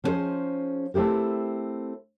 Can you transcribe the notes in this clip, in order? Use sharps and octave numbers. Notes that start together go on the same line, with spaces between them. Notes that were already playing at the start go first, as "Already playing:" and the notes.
F3 B3 C#4 D#4 G#4 C5
A3 C4 E4 G4 A#4